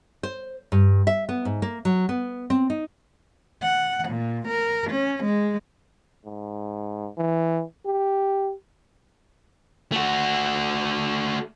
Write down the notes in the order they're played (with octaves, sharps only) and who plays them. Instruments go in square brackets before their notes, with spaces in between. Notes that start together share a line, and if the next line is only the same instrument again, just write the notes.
[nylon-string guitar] C5
G2
E5
B3
G#2
A#3
F#3
B3
C4
D#4
[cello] F#5
A#2
A#4
C#4
G#3
[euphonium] G#2
E3
G4
[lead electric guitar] A3 F#4